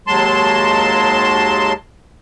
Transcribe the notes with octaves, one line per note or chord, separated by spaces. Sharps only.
D#2 F#3 G#3 A5 C6